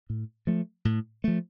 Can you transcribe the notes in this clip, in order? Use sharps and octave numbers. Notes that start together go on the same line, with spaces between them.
A2
F3 A3
A2
F3 A3